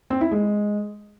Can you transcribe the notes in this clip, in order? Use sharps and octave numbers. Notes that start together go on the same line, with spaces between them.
C4
E4
G#3